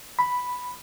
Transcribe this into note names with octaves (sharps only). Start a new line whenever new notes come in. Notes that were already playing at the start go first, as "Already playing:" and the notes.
B5